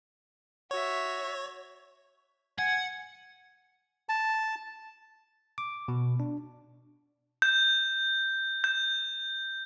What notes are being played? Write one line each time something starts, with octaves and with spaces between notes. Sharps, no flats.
F#4 C#5 E5
F#5 G#5
A5
D6
B2
D4
G6
G6